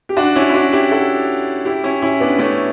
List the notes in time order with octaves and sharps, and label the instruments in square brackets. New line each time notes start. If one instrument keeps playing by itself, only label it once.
[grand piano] G4
D4 F#4
C#4 E4
E4
D4 F#4
E4 G4
F#4 A4
E4 G4
C#4 E4
C#4 E4
B3 D4
A3 C#4